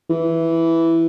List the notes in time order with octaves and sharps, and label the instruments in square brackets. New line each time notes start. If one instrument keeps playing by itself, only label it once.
[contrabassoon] E3